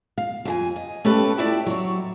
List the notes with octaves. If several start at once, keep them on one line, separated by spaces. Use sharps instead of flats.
F5
F2 G#4 G#5
D#5
A3 C#4 G4 A4 B4
F2 E4 G4 D5 E5
F#3 C#5